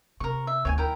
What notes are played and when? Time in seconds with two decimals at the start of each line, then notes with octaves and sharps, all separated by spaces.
0.20 C3 A#4 C#6
0.47 E5
0.65 D2 D#3 C#5 G5 G#5
0.78 E4 A#4 G5